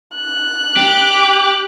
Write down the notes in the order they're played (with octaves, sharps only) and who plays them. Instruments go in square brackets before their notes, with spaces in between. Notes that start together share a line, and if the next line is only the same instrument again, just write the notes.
[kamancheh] F#6
[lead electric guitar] G4 [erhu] D6